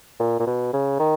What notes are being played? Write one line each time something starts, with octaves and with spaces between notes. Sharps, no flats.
A#2
A#2
B2
C#3
D#3